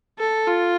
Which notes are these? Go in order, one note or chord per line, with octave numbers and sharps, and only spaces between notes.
A4
F4